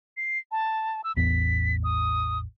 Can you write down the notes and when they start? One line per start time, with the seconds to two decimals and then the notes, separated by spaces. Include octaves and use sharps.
0.17 C7
0.52 A5
1.04 E6
1.17 A1 E2 B3 B6
1.84 D#6